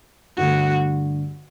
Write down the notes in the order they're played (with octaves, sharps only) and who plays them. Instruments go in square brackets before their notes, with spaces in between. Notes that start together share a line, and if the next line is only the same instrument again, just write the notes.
[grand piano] G2 D3 A3 [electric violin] F#4